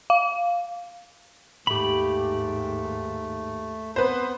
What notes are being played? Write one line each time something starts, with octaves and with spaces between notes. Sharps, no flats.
F5
D#2 G#2 A3 G4 B5
B3 C4 B4 C5